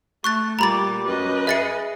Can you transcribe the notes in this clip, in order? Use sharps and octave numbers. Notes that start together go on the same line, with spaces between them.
A3 C#6 F#6 A6
A#2 G3 A#5 B5 D6 A6
F#2 B4 D#5
G#4 E5 A6 C#7